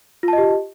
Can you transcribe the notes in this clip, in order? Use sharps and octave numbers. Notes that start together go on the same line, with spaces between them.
F4 G4 D#5 A5